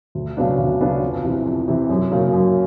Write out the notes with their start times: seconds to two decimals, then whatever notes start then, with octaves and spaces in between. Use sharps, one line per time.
0.15 D2
0.37 C#3 F#3 B3 D4
0.58 D2
0.80 C#3 F#3 B3 D4
1.02 F2
1.24 C3 E3
1.46 F2
1.68 C3 E3
1.90 F#2
2.12 C#3 F#3 A#3
2.33 F#2